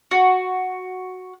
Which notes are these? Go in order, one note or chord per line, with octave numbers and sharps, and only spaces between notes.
F#4